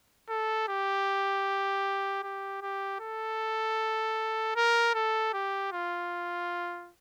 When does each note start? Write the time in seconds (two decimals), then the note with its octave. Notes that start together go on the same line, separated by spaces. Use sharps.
0.29 A4
0.68 G4
2.23 G4
2.62 G4
3.00 A4
4.56 A#4
4.94 A4
5.34 G4
5.72 F4